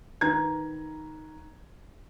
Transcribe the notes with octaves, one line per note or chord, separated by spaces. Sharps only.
D#3 B4 A#5 G#6